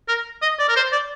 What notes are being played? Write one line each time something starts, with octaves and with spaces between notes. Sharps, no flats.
A#4
D#5
D5
A#4
C5
D5